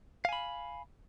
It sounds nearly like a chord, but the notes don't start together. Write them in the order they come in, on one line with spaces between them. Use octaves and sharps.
F5 G#5 B5